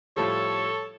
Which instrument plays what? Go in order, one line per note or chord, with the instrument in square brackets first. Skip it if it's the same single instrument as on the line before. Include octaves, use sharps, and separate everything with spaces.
[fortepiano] A2 F3 G3 [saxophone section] A4 [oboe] C#5